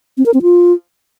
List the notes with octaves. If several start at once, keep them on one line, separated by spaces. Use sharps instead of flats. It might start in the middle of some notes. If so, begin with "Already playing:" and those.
C4
A#4
C4
F4